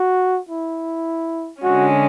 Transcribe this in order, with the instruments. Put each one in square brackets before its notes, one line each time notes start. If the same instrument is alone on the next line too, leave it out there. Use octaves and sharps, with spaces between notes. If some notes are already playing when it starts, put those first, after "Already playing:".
Already playing: [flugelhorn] F#4
E4
[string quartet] D3 G#3 C#4 [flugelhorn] F#4